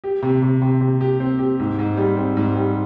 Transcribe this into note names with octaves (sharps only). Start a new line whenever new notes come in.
G4
C3
C3
C3
C3
G4
C4
G4
G#2
G#2
G3
C4
G#2
G3